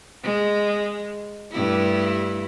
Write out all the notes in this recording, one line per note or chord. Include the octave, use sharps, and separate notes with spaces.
G#3
G2 A3 E4